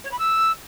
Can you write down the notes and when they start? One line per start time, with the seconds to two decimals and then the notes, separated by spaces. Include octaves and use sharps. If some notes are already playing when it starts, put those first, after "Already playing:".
0.04 C#5
0.11 B5
0.18 E6